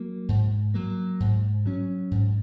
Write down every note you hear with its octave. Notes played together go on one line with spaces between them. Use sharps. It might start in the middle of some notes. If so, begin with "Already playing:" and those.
Already playing: F#3 A#3
G#2
F#3 A#3
G#2
F#3 C#4
G#2